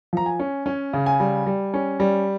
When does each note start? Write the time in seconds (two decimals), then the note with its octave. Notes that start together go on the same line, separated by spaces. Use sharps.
0.13 F3 A#5
0.26 G#5
0.40 C#4
0.66 C#4 G#5
0.93 C#3
1.06 G#5
1.20 G3
1.46 G3
1.74 C#4
2.00 G3